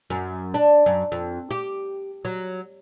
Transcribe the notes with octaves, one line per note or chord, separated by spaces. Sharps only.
F#2
D4
F#2
F2
G4
F#3